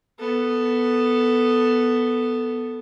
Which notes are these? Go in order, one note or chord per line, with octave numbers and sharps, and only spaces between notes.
B3 A4